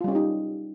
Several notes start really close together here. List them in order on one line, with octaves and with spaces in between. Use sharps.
F4 G3 C#4 G4 D#4